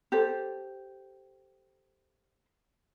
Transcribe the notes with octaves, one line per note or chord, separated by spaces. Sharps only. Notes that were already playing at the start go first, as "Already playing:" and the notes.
G4 A4 C5